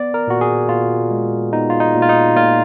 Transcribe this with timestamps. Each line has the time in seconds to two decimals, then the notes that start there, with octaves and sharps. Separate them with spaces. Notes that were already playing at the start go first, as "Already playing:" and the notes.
Already playing: B3 D5
0.14 A#4
0.28 A#2 F#4
0.41 G#4
0.69 A#2 F4
1.11 G#3
1.53 B3 D#4
1.70 F4
1.80 D#4
1.95 A#2
2.02 F4
2.09 D#4
2.36 A#2 F4